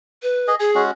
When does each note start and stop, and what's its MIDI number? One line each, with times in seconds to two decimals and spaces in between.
0.23 0.52 71
0.48 0.55 68
0.48 0.55 75
0.59 0.82 68
0.59 0.71 80
0.75 0.91 56
0.75 0.91 61
0.75 0.91 66